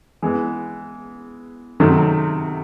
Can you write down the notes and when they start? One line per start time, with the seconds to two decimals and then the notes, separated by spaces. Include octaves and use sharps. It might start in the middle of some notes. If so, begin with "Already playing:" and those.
0.23 E3 G#3 B3
1.80 C3 D#3 F#3 A3